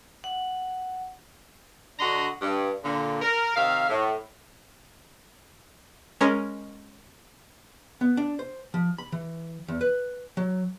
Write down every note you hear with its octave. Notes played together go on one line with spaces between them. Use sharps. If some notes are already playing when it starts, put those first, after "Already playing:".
F#5
D3 D4 F#4 D#5 A#5 C6
G2
A#2 D3
A#4
C3 D#3 E5 F5
A2
G#3 C#4 A#4
B3
D4
C5
F3
B5
E3
E2
B4
F#3